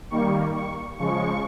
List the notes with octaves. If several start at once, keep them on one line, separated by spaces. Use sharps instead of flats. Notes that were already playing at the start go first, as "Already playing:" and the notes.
D#3 G3 A#3 C#6
C#6
C#3 F3 G#3 C#6